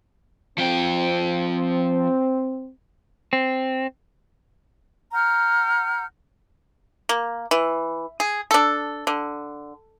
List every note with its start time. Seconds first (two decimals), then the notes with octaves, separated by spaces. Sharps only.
0.58 F3 C4 G5
3.33 C4
5.13 F#5 A#5 F6 G6
7.09 A#3
7.51 E3
8.20 G#4
8.51 D4 A4
9.07 D3